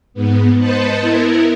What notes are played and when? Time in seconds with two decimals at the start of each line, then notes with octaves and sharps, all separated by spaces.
0.14 G#2 B3
0.58 B4 C5 D#5 A5 C#7
1.01 B3 E4 A#4